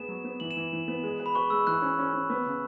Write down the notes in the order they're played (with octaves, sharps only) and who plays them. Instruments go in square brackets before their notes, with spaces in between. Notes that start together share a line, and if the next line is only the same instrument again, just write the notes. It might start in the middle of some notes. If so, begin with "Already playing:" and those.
Already playing: [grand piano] B3 G#4 [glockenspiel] E7
[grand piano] F#3
B3
[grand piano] E3 [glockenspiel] F#7
[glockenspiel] E7
[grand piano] E3
E3
B3
G#3
B4
[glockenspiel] B5
[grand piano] B4 [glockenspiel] C#6
[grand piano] G#3 [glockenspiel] E6
[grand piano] E3 [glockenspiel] F#6
[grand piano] C#4
C#4
C#4
B3
C#3